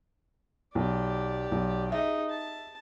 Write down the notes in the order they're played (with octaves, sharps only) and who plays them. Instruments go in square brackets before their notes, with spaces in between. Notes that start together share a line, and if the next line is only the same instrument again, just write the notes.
[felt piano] B1 [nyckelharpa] G4 D5
[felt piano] B1
[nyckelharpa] D#4 G#4 [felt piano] E5
[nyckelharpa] A5